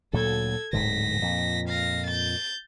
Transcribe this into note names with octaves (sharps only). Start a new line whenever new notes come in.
D2 A#2 F#3 A4 G#6
D1 G#2 D3 A#6 B6
F2 A#2
F5 A#6
G6 A6